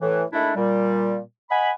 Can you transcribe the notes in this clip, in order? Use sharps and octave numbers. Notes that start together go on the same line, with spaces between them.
A2 E3
D#2 G#3 A3 D4 E4
A#2 G3
D#5 F#5 G#5 B5